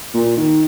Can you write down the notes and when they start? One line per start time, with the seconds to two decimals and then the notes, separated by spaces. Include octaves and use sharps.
0.14 A#2
0.37 D#3